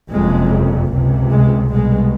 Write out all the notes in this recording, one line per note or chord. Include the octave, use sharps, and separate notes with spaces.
F#1 F2 C3 G#3
C#2 C3
G#3
C2 B2 G#3